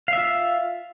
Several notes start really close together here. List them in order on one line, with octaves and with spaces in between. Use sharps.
F5 E5 F4